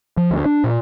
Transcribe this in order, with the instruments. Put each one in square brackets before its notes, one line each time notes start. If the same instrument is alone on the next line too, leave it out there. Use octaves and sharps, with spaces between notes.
[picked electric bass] F3
D2
D4
A#2